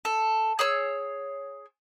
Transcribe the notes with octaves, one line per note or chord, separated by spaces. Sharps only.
A4
G#4 C#5 E6